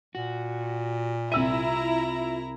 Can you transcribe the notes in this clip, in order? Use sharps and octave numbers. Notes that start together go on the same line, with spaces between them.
A#2 F#4
C2 E4 F4 E5 A#5 E6 D#7